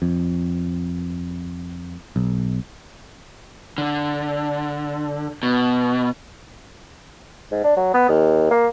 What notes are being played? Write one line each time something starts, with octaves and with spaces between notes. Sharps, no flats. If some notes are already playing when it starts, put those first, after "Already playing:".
F2
B1
D3
B2
G#2
D4
F#3
B3
D#2
A#3